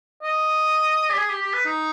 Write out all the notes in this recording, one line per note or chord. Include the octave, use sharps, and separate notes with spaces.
D#5
G4
G#4
G4
G4
B4
D#4